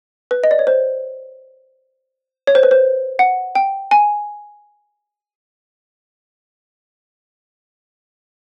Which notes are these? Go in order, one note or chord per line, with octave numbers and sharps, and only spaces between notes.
B4
D#5
D5
C#5
C5
C#5
C5
B4
C5
F#5
G5
G#5